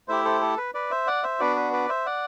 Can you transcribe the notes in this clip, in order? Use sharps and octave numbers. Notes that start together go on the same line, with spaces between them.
A3 E4 G4 C5 E5
A4 C5
A4
B4
B4 D5
C5 E5
D5 F#5
C5 E5
B3 D4 F#4 B4 D5
B4
B4 D5
C5 E5
D5 F#5